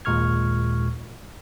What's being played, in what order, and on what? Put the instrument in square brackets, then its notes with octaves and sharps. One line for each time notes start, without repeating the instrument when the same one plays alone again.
[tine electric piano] D#2 A#2 G#3 C#6 F6 G#6